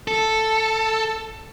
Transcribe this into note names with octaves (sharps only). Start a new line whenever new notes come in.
A4